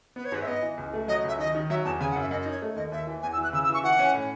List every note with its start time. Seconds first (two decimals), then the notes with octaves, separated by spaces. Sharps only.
0.16 B3 B4
0.25 C#5
0.32 G#2 B4
0.42 E5
0.47 B3 D#5
0.62 E3
0.77 C#2
0.94 A3
1.08 F#3 D#5
1.23 C#2
1.28 E5
1.38 D#3 D#5
1.55 D#3
1.70 F#3 E5
1.85 E2 A5
2.00 C#3 G#5
2.11 F#5
2.16 F#2
2.21 E5
2.31 F#2 D#5
2.41 D#5
2.46 D#4
2.51 C#5
2.62 A3
2.76 D#2 D#5
2.92 D#2 E5
3.07 E3
3.22 E2 G#5
3.33 E6
3.38 E3
3.44 F#6
3.53 C#3 E6
3.64 E6
3.69 E3 C#6
3.84 E3 F#5
3.99 C#4
4.14 A2